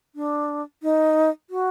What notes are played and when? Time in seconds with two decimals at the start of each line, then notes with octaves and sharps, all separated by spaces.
0.15 D4
0.83 D#4
1.50 F#4